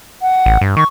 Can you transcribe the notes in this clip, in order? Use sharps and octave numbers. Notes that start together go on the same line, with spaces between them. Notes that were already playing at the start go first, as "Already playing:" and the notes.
F#5
A1
G2
D#3 C#6